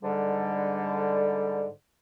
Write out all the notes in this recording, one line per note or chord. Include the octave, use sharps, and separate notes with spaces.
G#2 D3 G3